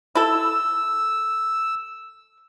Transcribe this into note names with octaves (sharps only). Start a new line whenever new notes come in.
E4 A4 E6